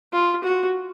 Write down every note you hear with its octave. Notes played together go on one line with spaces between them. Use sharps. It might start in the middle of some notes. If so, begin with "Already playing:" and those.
F4
F#4